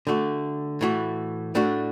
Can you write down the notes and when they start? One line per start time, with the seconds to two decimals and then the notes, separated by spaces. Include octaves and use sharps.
0.07 D3 A3 F#4
0.81 A2 E3 A3 F#4
1.55 A2 A3 D4 F#4